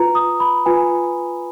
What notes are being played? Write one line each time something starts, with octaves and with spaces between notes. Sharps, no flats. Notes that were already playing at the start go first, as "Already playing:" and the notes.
Already playing: F4 B4 A#5
D#6
B5
F4 B4 G#5